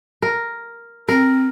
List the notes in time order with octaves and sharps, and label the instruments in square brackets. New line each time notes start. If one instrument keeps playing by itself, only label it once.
[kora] A#4
[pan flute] C4 [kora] A#4